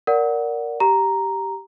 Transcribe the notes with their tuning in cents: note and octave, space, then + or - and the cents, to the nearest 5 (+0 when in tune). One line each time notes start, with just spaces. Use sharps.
A#4 +0 D5 -15 F#5 +0
G4 -5 A#5 +0